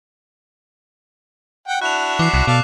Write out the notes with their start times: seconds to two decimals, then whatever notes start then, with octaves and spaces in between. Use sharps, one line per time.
1.68 F#5 G5
1.82 D4 E4 F#4 F#6 F7
2.19 E3 D6 C7
2.34 C2
2.47 B2 A4 D5 F5